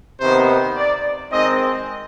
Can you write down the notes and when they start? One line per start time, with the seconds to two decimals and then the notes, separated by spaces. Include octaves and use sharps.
0.20 C3 D#3 B3 C5
0.76 D5
1.32 D#3 G#3 C4 D#4 D#5